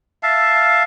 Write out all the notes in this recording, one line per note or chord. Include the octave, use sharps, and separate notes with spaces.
E5 F5 A5